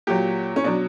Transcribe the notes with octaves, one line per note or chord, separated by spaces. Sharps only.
A#2 F#3 G4
C#4
B2 F#3 D4